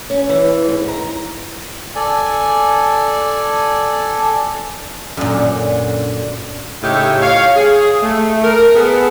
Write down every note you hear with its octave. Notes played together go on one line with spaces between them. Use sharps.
C#4
E3
G#2
A#5
A4 D5 G#5
F#2 A#2 D3
A2 C#3 D#4 G4 C#5 E5
C#5 F5
G#4
A3
A#4
B3 G#4 A4